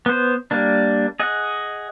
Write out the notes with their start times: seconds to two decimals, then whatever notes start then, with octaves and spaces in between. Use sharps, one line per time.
0.06 B3 C5
0.51 G3 A#3 D4
1.20 G#4 D#5 F#5